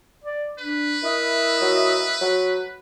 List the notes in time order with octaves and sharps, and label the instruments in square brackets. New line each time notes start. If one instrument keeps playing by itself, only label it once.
[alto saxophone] D5
[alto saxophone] D4 [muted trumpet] B4
[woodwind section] E4 A#4 D#5 [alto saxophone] E5
[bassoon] F#3
F#3